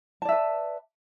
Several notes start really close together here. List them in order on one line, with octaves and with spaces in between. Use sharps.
A5 D5 E5 B4